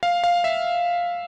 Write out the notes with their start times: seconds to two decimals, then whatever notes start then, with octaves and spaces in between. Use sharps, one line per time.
0.03 F5
0.24 F5
0.44 E5